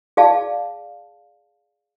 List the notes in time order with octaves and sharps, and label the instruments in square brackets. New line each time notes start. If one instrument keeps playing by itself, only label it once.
[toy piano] G#4 D5 F5 A5